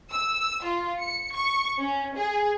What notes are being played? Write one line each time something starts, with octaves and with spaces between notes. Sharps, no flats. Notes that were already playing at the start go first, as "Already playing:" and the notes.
E6
F4
C#7
C#6
C#4
G#4